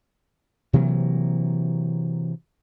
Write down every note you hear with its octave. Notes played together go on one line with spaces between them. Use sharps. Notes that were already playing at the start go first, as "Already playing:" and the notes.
C3 E3 F#3 A#3